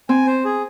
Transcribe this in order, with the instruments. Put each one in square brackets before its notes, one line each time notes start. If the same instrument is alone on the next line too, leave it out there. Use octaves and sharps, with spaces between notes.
[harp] C4 [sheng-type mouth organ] G#5
[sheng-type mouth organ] C5
G#4